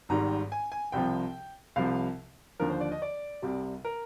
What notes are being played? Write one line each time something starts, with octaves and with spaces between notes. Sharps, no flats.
G#1 G#2 D#3 G3 A#5
G#5
G#5
C2 C3 F3 G5
C2 C3 F3 F5
D#2 D3 F3 A#4
C5
D5
D#5
D5
C2 C3 G3
A#4